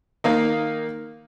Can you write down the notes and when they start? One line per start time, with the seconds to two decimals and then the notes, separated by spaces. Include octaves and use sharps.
0.24 D#3 A#3 D#4